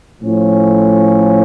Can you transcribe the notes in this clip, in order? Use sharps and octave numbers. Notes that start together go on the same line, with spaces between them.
A2 F3 C#4